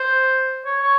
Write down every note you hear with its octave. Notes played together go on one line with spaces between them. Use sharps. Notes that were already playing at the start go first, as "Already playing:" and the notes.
Already playing: C5
C#5
C#5